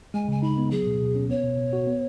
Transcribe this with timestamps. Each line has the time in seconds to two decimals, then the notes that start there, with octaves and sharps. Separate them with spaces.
0.14 G#3 G#5
0.28 C#3 G#5
0.43 D#4 B5
0.57 B3
0.71 F#3 G#4
0.87 B2
1.01 B2
1.15 C#4
1.29 B3 C#5
1.43 B2
1.58 B2
1.73 F#4
1.87 B3